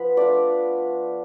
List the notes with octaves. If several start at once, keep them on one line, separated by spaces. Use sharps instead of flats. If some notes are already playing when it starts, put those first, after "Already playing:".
Already playing: F3 B3 B4
A3 D4 F4 D5